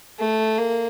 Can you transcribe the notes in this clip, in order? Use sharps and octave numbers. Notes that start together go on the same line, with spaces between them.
A3
A#3